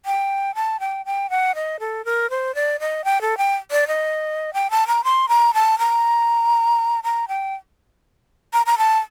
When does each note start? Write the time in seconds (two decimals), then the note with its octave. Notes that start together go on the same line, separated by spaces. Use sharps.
0.06 G5
0.55 A5
0.80 G5
1.06 G5
1.30 F#5
1.55 D#5
1.80 A4
2.05 A#4
2.30 C5
2.55 D5
2.80 D#5
3.05 G5
3.21 A4
3.38 G5
3.71 D5
3.88 D#5
4.54 G5
4.71 A5
4.87 A#5
5.04 C6
5.29 A#5
5.54 A5
5.79 A#5
7.04 A#5
7.28 G5
8.53 A#5
8.66 A#5
8.78 A5